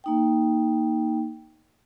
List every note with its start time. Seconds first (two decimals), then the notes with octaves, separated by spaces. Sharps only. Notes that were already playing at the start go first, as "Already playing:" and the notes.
0.04 A#3 D#4 G5